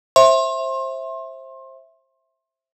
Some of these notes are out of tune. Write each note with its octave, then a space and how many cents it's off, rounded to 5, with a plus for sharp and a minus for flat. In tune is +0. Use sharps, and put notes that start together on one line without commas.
C5 +25 E5 +0 C6 +30